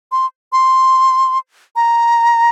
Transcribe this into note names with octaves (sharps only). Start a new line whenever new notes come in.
C6
C6
A#5